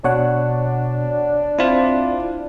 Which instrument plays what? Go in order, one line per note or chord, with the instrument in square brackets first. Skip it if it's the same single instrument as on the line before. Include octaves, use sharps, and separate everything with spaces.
[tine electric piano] B2 [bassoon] D4 [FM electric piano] C#5 F#5
[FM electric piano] C4 [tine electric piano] E4 F4